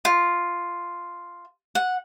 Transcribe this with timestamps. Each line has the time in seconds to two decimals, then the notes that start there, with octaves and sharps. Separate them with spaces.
0.05 F4
1.75 F#5